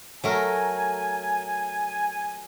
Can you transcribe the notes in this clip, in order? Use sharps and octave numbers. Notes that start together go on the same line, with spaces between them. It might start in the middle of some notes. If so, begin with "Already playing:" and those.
F#3 A3 A#4 G#5